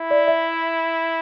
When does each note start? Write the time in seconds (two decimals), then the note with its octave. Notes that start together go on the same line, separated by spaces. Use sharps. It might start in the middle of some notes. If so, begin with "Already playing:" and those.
Already playing: E4
0.11 D5
0.28 E5